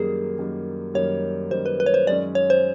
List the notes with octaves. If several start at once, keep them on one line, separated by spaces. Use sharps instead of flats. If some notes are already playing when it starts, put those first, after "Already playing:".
Already playing: F#2 D#3 G3 A#3 G#4
F#2 D#3 G3 A#3
F#2 D#3 G3 A#3 C#5
F#2 D#3 G3 A#3 C5
B4
B4
C#5
C5
F#2 D#3 G#3 C#4 D5
C#5
C5